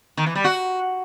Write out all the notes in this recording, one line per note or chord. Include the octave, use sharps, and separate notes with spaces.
D#3
E3
G3
F#4